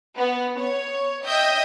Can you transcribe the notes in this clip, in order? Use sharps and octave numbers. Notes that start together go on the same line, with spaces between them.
B3
C#5
D#5 E5 G5 G6